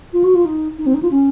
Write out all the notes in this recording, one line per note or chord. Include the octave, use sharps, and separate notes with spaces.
F4
F#4
F4
D#4
D#4
C4
D#4
F4
C#4